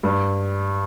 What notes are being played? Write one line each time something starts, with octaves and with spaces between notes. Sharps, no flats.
G2